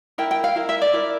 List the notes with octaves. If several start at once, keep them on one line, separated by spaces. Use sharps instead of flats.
E4 A#4 G5
G5
F5
E4 A#4
E5
D5
E4 A#4